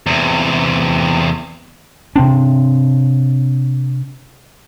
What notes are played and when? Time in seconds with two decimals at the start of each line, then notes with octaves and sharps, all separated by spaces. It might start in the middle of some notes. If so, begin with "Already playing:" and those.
0.06 E2 C3
2.16 C3 C4 D4